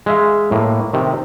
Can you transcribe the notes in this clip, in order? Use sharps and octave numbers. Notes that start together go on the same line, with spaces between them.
G#3 E5 F5
A2 A#3
C3 D#3